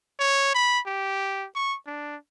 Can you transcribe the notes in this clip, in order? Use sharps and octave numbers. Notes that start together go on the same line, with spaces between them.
C#5
B5
G4
C#6
D4